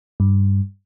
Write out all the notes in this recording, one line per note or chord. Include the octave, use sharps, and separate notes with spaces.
G2